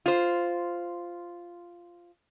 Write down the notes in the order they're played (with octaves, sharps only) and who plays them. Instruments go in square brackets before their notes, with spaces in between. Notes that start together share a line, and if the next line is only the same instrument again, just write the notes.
[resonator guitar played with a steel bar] F4 C5